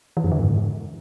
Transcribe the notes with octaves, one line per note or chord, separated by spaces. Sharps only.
E3
F#2
D3
G#2